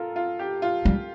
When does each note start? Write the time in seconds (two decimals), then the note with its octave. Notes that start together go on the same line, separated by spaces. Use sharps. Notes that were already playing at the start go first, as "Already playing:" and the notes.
Already playing: F4 A4 A#4
0.16 F4
0.39 G4
0.62 F4
0.85 G3